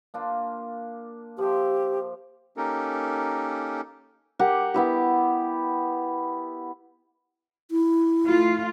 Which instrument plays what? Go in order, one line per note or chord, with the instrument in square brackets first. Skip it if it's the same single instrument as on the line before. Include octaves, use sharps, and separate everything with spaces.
[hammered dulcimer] A#3 D4 F4
[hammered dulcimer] F3 E5 [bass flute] G4
[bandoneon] A#3 C#4 D#4 G4 A4 A#4
[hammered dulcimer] G4 A#4 F#5 D6
B3 E4 G4
[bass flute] E4
[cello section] A3 F4